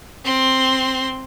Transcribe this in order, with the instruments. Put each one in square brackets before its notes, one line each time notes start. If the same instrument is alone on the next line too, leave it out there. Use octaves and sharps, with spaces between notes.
[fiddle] C4 C6